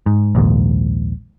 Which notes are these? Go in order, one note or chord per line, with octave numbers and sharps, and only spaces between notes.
G#2
A#1 D#2 G#2